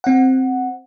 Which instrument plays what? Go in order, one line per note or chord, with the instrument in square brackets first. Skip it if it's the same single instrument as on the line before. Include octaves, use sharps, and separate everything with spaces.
[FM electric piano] C4 F#5